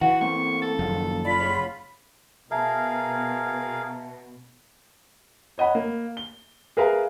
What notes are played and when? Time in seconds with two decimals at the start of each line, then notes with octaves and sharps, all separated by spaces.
0.01 E3 F#4 F#5
0.21 A3 A#3 C4 C#6
0.62 A4
0.79 F#1 A#2 D#3 F3
1.25 F4 D5 B5
1.40 F#2 G#4 C#5
2.51 B2 G#4 A#4 E5 F5 A5 A#5
5.58 C#5 D#5 F#5 B5
5.75 A#3
6.17 G7
6.77 G#4 A#4 B4 E5 F5 A#5